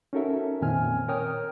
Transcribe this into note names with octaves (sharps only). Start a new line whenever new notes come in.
C#4 D#4 F#4 A4 A#4 E5
F2 A#2 D#3 C4 G#5 F6
A#4 C#5 G5 D#6 F6